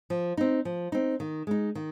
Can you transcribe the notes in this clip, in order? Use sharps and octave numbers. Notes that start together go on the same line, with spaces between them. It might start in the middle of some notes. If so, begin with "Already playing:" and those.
F3
C4 D#4
F3
C4 D#4
D#3
G#3 D#4
D#3